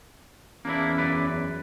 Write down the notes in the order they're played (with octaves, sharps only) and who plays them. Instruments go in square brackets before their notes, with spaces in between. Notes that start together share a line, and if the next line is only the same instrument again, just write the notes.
[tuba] E2 [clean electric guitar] A#3 D4 E4 [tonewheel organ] C#4
[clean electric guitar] F#2 B4 D5